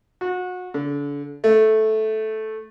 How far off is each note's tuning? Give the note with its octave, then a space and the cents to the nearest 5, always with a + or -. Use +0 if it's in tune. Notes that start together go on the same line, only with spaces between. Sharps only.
F#4 -30
D3 -35
A3 -10